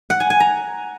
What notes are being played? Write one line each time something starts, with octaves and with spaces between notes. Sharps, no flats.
F#5
G#5
G#5
A#5